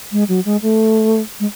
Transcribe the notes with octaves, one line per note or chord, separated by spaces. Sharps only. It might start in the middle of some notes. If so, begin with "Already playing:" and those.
G#3
F#3
G#3
A3
G#3